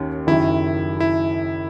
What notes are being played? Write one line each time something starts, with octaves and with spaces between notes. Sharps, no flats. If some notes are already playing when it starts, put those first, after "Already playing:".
Already playing: D#2 D#3 C#4
F#1 F#2 D#3 E4
E4